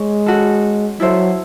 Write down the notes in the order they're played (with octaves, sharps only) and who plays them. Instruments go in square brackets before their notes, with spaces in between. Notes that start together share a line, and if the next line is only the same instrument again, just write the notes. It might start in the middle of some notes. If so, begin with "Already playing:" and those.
Already playing: [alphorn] G#3 [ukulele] C#5
[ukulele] C#4 F#4 A4
[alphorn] F#3 [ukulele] E4 A4 C5 E5